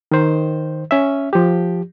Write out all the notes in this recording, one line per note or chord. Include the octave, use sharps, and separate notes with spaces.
D#3 C5
C#4 E5
F3 G4